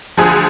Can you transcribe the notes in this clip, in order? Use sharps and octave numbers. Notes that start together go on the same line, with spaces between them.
D2 D3 F3 G#4 G#5